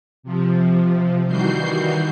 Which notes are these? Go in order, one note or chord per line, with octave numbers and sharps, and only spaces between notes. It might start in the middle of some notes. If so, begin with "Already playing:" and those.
C3 F3
D#3 E3 G3 F#4 G6 C7